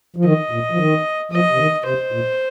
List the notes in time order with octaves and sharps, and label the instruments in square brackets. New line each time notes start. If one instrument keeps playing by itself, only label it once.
[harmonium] F3
[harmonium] D#3 [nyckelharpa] D#5
[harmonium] A#2
F3
D#3
[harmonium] F3 [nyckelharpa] D#5
[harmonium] C3
D#3
[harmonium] C3 [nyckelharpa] C5
[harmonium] A#2